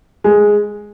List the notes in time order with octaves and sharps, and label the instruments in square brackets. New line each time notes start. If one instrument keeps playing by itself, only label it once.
[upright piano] G#3